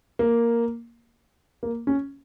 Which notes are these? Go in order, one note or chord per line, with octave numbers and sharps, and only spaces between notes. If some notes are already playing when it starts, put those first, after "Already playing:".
A#3
A#3
C#4